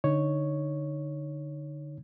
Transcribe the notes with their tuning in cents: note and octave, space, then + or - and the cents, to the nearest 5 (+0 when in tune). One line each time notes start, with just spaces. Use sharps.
D3 +0 D#4 +0 C#5 +0